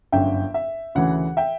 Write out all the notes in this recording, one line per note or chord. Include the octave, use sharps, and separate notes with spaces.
G1 F#2 D3 E5 G5
E5
D2 C#3 E3 F#5
E5 G5